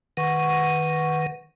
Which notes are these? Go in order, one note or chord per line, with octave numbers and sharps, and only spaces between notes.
D#3 B4 F#5 C#6